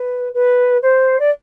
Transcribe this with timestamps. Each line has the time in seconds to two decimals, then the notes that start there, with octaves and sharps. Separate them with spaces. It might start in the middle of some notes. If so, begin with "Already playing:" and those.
Already playing: B4
0.34 B4
0.82 C5
1.19 D5